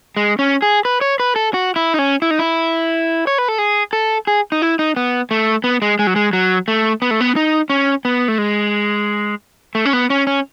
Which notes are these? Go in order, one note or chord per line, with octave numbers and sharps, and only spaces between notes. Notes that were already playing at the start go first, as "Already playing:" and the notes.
G#3
C#4
G#4
B4
C#5
B4
A4
F#4
E4
D#4
C#4
E4
D#4
E4
C#5
B4
A4
G#4
A4
G#4
D#4
E4
D#4
B3
A3
B3
G#3
G#3
F#3
G#3
F#3
A3
B3
A3
B3
D#4
C#4
B3
A3
G#3
A3
C#4
B3
C#4
C#4